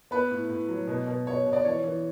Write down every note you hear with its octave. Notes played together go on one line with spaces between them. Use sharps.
B3 B4
A2
A2
F#3
B2
B2
B2 C#5
B2
D5
E3 C#5
E3